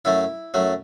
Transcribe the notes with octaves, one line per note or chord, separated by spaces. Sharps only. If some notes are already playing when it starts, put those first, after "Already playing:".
F#2 F#3 A3 E4
F#2 F#3 A3